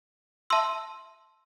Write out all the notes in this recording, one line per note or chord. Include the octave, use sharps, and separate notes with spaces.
E5 A5 C6 E6